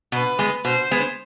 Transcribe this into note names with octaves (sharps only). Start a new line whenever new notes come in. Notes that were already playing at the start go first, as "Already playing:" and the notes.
B2 B4
G#3 B3
B2 C5
G#3 B3